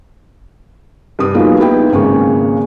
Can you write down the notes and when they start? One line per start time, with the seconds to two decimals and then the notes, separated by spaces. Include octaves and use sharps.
1.19 G2 C3 D#6
1.34 F#3 G#3 A#3 B3 D#4 F4
1.60 B3 D#4 E4 G4 G5
1.92 G#1 C#3 G#3 A#3 C#6